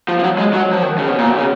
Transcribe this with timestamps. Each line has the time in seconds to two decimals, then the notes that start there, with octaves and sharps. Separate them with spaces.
0.08 F3
0.19 F3
0.23 F#3
0.38 G#3
0.53 F#3
0.73 F3
0.83 D#3
0.98 C#3
1.09 B2
1.18 A#2
1.29 B2
1.38 C#3